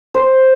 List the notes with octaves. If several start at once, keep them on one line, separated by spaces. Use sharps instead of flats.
C5